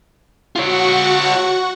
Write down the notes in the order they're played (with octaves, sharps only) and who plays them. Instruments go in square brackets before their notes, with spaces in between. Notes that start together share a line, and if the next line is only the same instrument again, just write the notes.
[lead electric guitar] F4 C#5 [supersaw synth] F#4 F#5 C#6